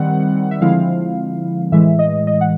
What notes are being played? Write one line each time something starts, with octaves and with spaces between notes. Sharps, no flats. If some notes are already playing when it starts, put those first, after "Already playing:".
Already playing: D#3 G3 C4 F#5
E5
D3 F3 G#3 C4 E4 F5
A2 E3 G#3 E5
D#5
D#5
F#5